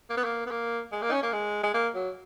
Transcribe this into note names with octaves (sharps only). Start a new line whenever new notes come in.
A#3
B3
A#3
B3
A#3
G#3
A#3
D#4
C#4
A#3
G#3
G#3
A#3
F#3